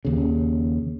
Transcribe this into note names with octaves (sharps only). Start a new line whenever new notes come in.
D#2 C#3